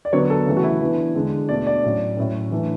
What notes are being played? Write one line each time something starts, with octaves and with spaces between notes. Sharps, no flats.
D5
D3 F#3 B3 C#5
A4
C#3 E3 A3
F#4
E4
E3 B3 D4
D3 G#3 D4
B2 A3 D4 D5
D5
A2 F#3 C#4
A2 F#3 C#4
E3 A3 D4